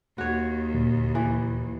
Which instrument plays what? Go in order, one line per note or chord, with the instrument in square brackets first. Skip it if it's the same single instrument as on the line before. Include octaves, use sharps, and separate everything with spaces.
[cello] D#2 [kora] F#4 C#5
[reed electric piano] D2 A#2
[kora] E3